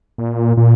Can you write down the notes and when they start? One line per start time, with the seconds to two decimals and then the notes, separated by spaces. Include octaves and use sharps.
0.18 A#2
0.57 A#2